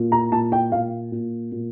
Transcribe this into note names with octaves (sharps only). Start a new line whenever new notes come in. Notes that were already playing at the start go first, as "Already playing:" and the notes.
Already playing: A#2
A#5
A#2 A5
G5
A#2 F5
A#2
A#2